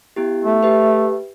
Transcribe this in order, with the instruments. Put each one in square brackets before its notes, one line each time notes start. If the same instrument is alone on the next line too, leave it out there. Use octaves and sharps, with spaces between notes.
[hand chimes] B3 E4 G4
[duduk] A3
[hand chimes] G4 B4 E5